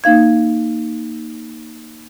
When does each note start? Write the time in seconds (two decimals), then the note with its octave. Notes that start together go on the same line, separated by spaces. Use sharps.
0.04 A#3 D#4 F5 G#6